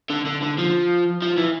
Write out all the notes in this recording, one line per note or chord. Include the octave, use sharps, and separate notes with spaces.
D3
D3
D3
F3
F3
E3